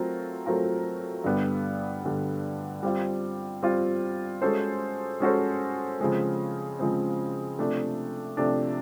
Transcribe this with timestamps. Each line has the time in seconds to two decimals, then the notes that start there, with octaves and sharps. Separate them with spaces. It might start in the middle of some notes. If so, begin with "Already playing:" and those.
Already playing: F#3 A3 C4 F4 A#4
0.46 F#3 A3 C4 F4 A#4
1.24 G2 D3 G3 B3
2.04 G2 D3 G3 B3
2.83 G3 C4 F4
3.62 G3 C4 F4
4.42 G#3 C#4 F#4 A4 C5
5.20 G#3 C#4 F#4 A4 C5
6.00 C#3 F3 G#3 C4
6.79 C#3 F3 G#3 C4
7.59 C3 F3 A3 D4
8.37 C3 F3 A3 D4